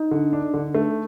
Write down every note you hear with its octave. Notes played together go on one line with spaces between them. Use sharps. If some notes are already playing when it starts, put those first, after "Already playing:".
Already playing: D#4
D3
D4
D3
A3